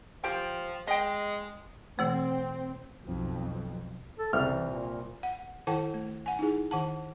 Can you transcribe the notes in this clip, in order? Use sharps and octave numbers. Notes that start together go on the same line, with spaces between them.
F3 G4 G5
G#3 D#5 G5
B2 E3 A3 C4
B1 F2
A4
C2 C#3 F6
E3
A#2
F#5
D#3 E4 A4 F#5 G5 A5
A3
F#5 G#5
D#4 E4 G#4
D#3 F#5 A5